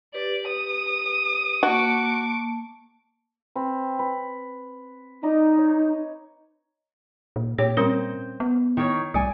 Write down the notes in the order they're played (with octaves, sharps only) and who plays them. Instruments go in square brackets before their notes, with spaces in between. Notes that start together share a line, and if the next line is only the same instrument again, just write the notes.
[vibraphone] G4 B4 [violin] D5
[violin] D#6
[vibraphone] A#3 A5 [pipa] F#4 [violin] C#6 D6
[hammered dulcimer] C4 B4
B4
[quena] D#4 [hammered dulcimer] D5 D#5 A#5
[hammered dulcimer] C#5
[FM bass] A#2
[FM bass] A#2 [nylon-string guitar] G4 [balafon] C#5
[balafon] G3 C#4 A#4 [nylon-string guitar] C4 C5
[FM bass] B3
[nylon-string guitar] D#3 C#5
[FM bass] C2 [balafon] G3 [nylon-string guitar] D5 G#5